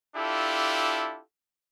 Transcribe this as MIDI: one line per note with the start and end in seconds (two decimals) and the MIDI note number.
0.15 1.21 62
0.15 1.21 64
0.15 1.21 65
0.15 1.21 67
0.15 1.21 69